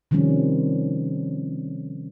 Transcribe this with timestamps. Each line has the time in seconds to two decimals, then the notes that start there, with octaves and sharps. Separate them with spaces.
0.11 C3 D#3 F3 G3 C#4